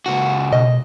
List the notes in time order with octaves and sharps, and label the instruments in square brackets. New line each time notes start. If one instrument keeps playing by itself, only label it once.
[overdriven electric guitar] C#2 F#4
[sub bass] B2 [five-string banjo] D#5